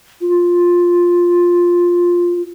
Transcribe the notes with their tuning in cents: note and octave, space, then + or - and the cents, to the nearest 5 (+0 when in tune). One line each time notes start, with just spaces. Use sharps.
F4 +5